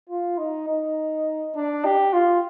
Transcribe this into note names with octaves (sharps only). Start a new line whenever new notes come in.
F4
D#4
D#4
D4
G4
F4